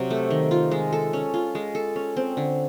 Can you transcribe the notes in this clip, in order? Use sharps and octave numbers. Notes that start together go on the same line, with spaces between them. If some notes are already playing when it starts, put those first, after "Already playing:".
Already playing: C3 F#3
A3
D#3
F4
G#3
A4
C#4
F4
G#3
A4
C#4
C4
D3